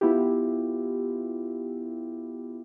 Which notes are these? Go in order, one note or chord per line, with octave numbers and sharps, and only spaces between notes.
B3 E4 F4 G4